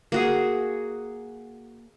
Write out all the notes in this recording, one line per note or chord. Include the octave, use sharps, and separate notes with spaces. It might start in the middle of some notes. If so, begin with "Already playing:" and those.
A#3 F#4 G#4